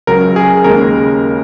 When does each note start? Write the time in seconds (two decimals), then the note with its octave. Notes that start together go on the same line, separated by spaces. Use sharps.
0.07 C#2 C#3 F#3 A#4
0.36 G#4
0.64 D#2 C#3 G#3 A#4